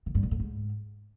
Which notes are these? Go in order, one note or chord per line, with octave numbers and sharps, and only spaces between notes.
D#3
G2
A#2
A2
G#2